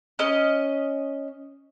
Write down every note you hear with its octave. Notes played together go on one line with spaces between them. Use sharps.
C#4 D#5